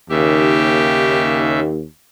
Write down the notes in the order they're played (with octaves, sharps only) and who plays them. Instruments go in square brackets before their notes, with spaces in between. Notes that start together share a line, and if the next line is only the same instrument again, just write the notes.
[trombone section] D#2 [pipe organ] C#3 E5 [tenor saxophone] G4